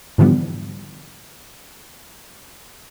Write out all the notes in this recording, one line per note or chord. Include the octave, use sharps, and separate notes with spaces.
G#2 D3 E3 F3 G3 B3